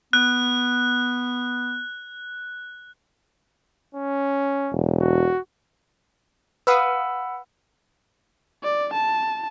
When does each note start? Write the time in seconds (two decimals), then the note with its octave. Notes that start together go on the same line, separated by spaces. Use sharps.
0.13 B3 F#6
3.95 C#4
4.72 E1
5.01 F#4
6.67 B4 F5 F#5 B5 D#6 E6
8.63 D5
8.93 A5